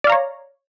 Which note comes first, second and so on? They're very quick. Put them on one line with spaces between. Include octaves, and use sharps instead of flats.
D5 F5 A#5 C#5